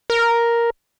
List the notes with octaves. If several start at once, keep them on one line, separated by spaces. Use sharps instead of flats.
A#4